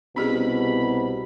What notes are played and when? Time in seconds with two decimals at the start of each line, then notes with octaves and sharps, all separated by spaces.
0.16 C2 B2 C#4 G4 G#4 B5